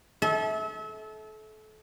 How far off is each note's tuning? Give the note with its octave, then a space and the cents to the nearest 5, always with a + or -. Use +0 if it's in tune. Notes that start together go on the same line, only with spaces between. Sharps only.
A4 -30 E5 -30